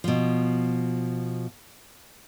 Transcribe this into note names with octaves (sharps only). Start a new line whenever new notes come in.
B2 F3